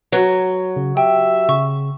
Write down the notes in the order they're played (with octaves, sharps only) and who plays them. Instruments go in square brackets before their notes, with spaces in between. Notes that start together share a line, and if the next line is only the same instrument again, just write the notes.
[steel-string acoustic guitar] F#3 [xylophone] B4 [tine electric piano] C#5
[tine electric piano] C#3
[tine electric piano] G4 [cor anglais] E5 [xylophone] G5
[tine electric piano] C#3 [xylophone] C#6